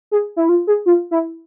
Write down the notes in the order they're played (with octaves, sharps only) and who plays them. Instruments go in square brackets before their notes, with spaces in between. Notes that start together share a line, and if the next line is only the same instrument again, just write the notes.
[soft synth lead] G#4
E4
F4
G#4
F4
E4